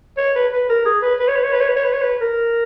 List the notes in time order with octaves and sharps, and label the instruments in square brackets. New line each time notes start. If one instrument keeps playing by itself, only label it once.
[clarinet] C#5
B4
B4
A#4
G#4
B4
B4
C#5
B4
C#5
B4
C#5
B4
C#5
B4
C#5
B4
A#4